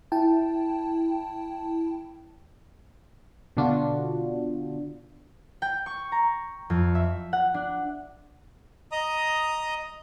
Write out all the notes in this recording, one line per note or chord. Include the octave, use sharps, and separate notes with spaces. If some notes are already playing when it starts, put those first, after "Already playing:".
E4 G5 A5
B2 D3 D4 F4 F#4
G5
C#6
A#5
F2
E5
F#5
D4
D#5 A#5 D#6